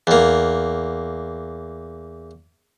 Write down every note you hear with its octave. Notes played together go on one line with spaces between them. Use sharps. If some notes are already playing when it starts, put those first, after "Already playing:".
E2 A#3